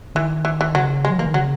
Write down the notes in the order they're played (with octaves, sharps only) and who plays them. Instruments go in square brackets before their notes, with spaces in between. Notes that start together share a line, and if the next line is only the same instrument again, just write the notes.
[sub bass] D#3 [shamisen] E3
[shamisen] E3
E3
[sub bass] C#3 [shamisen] F#3
[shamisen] G#3
[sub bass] F#3
[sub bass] E3 [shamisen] A#3
[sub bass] D#3
[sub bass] C#3 [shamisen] F#3